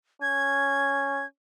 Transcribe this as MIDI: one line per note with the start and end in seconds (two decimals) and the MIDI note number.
0.22 1.24 61
0.22 1.26 92